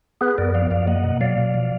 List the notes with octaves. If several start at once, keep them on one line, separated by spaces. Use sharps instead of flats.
B3 G#4 B4
F#2 A#4 D5
F3 D5 F5
F#2 D5 F5
A#3 D#5 F#5
B2
F#3 D5 F5
B2
F3